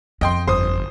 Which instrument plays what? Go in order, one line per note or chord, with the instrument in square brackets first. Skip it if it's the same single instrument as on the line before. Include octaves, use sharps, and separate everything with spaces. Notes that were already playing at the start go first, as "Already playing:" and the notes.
[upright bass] F2 [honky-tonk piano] D#5 G5 C6
[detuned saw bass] G1 [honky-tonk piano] C5 D#6